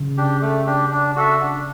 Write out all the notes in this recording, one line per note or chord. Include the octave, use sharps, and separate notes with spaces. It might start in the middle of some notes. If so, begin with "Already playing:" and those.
Already playing: C#3
D4 G4
A3
D4 G4
D4
F#4 A4 E5
D4